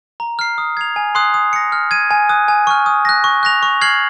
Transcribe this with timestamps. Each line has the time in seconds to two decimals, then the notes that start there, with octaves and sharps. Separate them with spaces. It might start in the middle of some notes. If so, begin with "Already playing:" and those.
0.20 A#5
0.39 F6 C7
0.58 D#6
0.77 G#6 C7 F7
0.96 G#5
1.15 C6 D#6 F#6 C7
1.34 D#6
1.53 A#6 C#7
1.72 F6
1.91 G#6 D#7
2.11 G#5
2.29 D#6 F#6
2.48 G#5
2.67 C#6 F6
2.86 D#6
3.05 F#6 A#6
3.24 C#6
3.43 F#6 A#6 F7
3.63 C#6
3.81 F6 G#6 C7 F#7